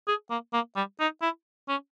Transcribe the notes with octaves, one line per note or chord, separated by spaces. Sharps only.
G#4
A#3
A#3
G3
D#4
E4
C#4